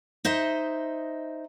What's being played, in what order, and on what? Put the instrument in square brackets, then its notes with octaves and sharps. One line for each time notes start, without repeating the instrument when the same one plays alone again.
[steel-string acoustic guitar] D#4 C5 D#5 E5